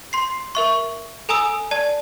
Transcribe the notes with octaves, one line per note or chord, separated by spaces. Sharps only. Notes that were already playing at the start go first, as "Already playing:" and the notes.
C6 C7
A#4 E5 C#6
A4 G#5 A#5 D#6 E6
D5 A5